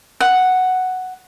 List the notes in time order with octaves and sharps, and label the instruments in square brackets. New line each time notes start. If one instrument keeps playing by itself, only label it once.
[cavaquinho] F#5